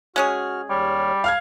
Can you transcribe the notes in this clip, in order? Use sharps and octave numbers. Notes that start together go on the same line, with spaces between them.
G#3 C#4 F#4 G#4 F6
D#2 G3 C#5 F6
F5 A5 F6 F#6 G#6